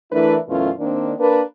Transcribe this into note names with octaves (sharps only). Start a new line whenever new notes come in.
E3 A3 D4 E4 A#4 B4
F#2 B2 E3 A3 C#4 F4
D#3 A#3 C4 D4
A#3 D4 A#4 B4